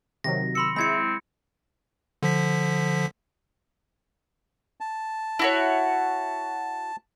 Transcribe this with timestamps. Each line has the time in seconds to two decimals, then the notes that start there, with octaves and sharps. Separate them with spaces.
0.24 C3 D#3 F#3 A#6
0.55 B5 C6 E6 C#7
0.76 G#3 C4 E4 B5 G#6 C#7
2.23 D3 F3 B6
4.80 A5
5.39 E4 F#4 C#5